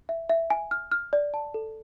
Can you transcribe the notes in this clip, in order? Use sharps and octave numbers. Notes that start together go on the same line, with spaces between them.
E5
E5
G#5
F6
F6
D5
A5
A4